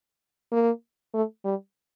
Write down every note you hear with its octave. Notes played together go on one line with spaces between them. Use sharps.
A#3
A3
G3